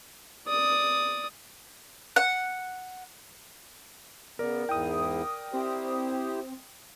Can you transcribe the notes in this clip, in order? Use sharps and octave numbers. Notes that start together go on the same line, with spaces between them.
D5 D#6
F#5
C#3 B3 A#4 D5
E2 G#2 E4 G5 D#6
C4 E4 G4 C5